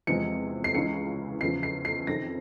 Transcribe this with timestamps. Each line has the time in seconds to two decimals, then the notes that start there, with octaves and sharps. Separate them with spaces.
0.07 E2 C3 F3 G#3 C#7
0.64 C7
0.74 C#2 C#3 E3 G#3 C#7
1.41 E2 C#3 F3 C7
1.63 C7
1.85 C7
2.07 F2 C3 D#3 A#6